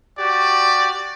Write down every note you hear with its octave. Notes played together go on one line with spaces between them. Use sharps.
F#4 G4 D5